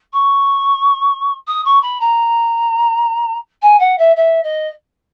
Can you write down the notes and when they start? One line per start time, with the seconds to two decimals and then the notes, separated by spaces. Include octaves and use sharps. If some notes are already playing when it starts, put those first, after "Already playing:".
0.13 C#6
1.47 D#6
1.65 C#6
1.82 B5
2.00 A#5
3.62 G#5
3.80 F#5
3.98 E5
4.16 E5
4.44 D#5